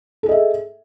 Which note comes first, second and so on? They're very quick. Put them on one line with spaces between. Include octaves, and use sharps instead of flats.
A4 G#4 D#5 E5